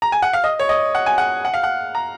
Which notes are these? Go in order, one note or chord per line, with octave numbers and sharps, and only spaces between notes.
A#5
G#5
F#5
F5
D#5
C#5
D#5
F#5
G#5
F#5
F#5
F5
F#5
A#5